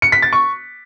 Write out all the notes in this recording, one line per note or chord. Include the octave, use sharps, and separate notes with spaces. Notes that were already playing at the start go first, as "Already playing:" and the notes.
C#7
B6
A6
C#6